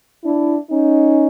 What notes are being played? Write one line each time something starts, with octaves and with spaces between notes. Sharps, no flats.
D4 E4
C#4 D#4